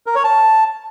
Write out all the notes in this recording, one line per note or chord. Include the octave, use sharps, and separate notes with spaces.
A#4
C#5
A5